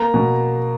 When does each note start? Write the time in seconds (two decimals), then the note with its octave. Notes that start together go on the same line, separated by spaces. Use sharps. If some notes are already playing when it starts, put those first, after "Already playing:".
Already playing: A#3 A#5
0.14 B2